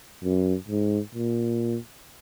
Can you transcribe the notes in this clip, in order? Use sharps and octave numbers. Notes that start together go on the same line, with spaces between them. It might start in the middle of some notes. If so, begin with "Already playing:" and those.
F#2
G#2
A#2